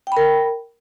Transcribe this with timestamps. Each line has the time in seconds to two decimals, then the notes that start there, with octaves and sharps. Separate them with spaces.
0.07 G5
0.12 B5
0.17 A#4